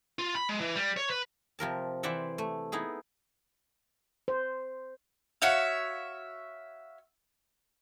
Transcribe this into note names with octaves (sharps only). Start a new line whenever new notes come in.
F4
B5
G#3
E3
G3
C#5
B4
C3 F3 A#4 A5
E3 C5 D5 E5 F#5
A3
B3 D#4 E4 G#4
C5
F#4 C#5 E5 F5